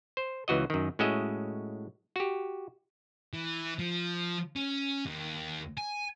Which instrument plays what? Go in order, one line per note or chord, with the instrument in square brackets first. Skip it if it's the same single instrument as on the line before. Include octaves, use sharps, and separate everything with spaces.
[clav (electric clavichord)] C5
C#2 E3 F#4 D#5
F#2 D#3
A2 G#3 C#4 F#4 D#5 E5
F#4 G4
[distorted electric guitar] E3
F3
C#4
D#2
G#5